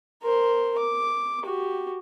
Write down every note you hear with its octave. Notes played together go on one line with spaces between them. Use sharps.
A#4 C5
D6
F#4 G4